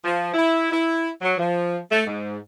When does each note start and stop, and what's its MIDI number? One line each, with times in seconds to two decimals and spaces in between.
0.04 0.31 53
0.34 0.68 64
0.71 1.09 64
1.22 1.35 54
1.38 1.77 53
1.91 2.02 57
2.06 2.36 44